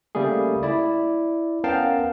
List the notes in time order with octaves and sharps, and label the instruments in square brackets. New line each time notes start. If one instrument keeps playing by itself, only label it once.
[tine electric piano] C#3 G3 A3 A#3 G#4
E4 D5
B3 C#4 A#4 F5 G5 A5